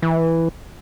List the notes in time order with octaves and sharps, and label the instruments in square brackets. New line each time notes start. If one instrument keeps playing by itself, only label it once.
[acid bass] E3